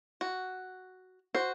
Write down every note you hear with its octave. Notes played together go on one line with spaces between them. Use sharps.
F#4
F#4 C5